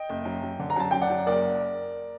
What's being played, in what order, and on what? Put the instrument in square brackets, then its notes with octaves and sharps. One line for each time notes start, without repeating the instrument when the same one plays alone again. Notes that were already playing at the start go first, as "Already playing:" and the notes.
Already playing: [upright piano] D#5 G5
F#1
F#2
F#2
D3
A#5
F#2 A5
F#2 G5
D5 F#5
F#2
F#1 A#4 D5